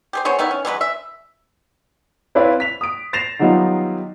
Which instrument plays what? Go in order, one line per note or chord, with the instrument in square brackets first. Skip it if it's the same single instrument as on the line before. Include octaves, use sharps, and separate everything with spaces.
[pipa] G4 G#4 C5
B3 G#4 C5 C#5
D#3 B3 D#4 E4
C#4
E3 F#3 G#3 B4
E5
[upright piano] C4 E4 B4 C#5 D5 F5
B6 F7
D#6 D7
A6 A#6 C7 E7 F7
D#3 F#3 G3 B3 D#4 F4